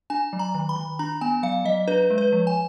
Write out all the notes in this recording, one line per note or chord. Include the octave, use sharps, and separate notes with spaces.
D4 G#5
F#3
A#5
D#3
B5
D#3
D4 A#5
B3 G#5
F#3 F5
F#3 D#5
D4 B4
G#3
B4
F3
G#5